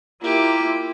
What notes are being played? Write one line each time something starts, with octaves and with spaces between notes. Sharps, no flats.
A#3 E4 F4 G4